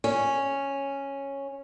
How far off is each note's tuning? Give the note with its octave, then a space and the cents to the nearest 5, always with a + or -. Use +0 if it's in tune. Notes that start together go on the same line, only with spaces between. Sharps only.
C#4 -5